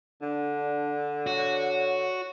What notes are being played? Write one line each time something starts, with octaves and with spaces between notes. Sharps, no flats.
D3 D4
F#4 C#5